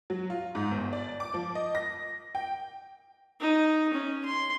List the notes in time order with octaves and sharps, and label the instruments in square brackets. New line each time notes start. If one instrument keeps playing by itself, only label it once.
[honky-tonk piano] F#3
F4
G#2
G1
D5
D6
F3
D#5
A#6
G5
[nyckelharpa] D#4
C#4
C6